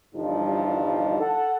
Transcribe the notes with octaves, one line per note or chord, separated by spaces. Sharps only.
G1 E2 G2 F3 G3 D#4
A4 F#5